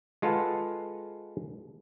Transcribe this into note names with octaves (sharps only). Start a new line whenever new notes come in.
G#3 F4 A4 B4 F5 F#5